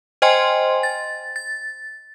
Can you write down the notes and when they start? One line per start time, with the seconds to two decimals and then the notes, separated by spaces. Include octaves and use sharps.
0.22 C5 D#5 G5 G#5 C6
0.83 A6
1.36 A6